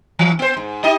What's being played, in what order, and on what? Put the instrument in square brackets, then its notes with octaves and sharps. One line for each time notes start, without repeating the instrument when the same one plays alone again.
[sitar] E3
B3 C5
G#2
D#4 G4 D#5